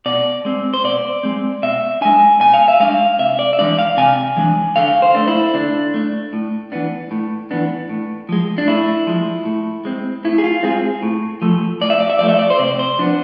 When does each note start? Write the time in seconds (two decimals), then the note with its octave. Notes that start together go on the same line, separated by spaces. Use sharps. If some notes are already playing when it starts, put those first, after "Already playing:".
0.06 B2 D5
0.45 G#3 C4
0.74 C5
0.84 B2 D5
1.23 G#3 C4
1.63 B2 E5
2.01 G#3 D4 G#5
2.40 B2 G#5
2.54 F5
2.68 E5
2.80 G#3 D4 F5
3.19 C3 E5
3.39 D5
3.53 E5
3.59 E3 G#3 D4 D5
3.79 F5
3.97 C3 G#5
4.37 E3 G#3 D4
4.76 D3 F5
5.02 C5
5.15 A3 D4
5.28 E4
5.54 D3 D4
5.94 A3 D4
6.33 A2
6.72 E3 B3 D4
7.11 A2
7.51 E3 B3 D4
7.89 A2
8.29 F3 G#3
8.58 D4
8.68 A2 E4
9.07 F3 G#3
9.45 A2
9.85 G#3 C4
10.25 A2 E4
10.38 G#4
10.44 F4
10.63 G#3 C4 G#4
11.03 A2
11.42 F3 A3
11.81 A2 D5
11.90 E5
12.01 D5
12.10 E5
12.19 F3 A3 D5
12.29 E5
12.39 D5
12.50 C5
12.59 C3 D5
12.79 C5
12.98 F3 B3 D4